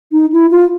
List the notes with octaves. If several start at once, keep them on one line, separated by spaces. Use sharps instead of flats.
D#4
E4
F4